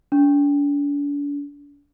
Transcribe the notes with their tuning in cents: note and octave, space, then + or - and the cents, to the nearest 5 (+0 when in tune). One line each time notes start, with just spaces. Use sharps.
D4 -40